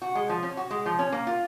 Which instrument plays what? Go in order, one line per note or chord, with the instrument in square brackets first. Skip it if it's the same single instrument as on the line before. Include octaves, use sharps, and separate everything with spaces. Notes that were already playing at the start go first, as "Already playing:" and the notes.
[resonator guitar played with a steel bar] F#4
G#3
F3
C#4
F#4
G#3
F3
C#4
A#3
F4